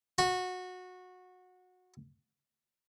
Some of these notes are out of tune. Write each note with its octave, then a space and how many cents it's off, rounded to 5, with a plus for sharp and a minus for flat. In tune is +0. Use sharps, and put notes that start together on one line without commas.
F#4 -20